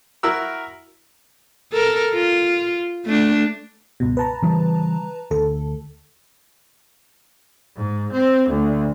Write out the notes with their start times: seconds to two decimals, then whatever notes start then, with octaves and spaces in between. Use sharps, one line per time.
0.23 E4 F#4 A#4 E6
1.73 A4 A#4
2.15 F4
3.06 A3 D4
4.00 C#2 G2 B2
4.17 B4 A5 A#5
4.42 C#3 E3 G3
5.31 D2 A4
7.76 G#2
8.12 C4
8.49 D2